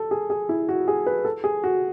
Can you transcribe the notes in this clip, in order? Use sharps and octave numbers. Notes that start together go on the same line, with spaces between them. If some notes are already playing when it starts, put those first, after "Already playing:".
Already playing: A4
G#4
G#4
E4
F#4
G#4
B4
A4
G#4
F#4